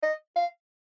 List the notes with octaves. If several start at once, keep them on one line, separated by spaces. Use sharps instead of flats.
D#5
F5